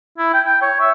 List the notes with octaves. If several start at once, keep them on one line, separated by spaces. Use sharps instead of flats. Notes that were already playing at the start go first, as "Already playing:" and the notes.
E4
G5
G5
C#5
E5